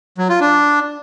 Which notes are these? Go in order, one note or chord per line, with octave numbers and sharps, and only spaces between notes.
F#3
F4
D4